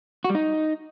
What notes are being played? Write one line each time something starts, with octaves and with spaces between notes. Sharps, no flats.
F#4
G3
D#4